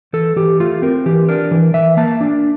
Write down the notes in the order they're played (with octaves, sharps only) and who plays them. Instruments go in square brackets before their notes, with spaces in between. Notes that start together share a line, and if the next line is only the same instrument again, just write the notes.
[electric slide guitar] E3 A4
E3 G4
A3 F4
C4 A#4
E3 G4
D4 A#4
E3
E3 E5
A#3 A5
D4